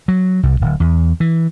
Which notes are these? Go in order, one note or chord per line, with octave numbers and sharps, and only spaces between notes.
F#3
C2
D1
E2
E3